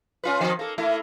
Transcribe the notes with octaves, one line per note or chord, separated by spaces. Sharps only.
C#4 F4 B4
D#3 F3 C4
A#3 A4
A3 A#3 E4